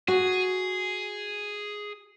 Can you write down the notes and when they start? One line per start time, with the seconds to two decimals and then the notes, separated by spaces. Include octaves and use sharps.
0.08 F#4 G#4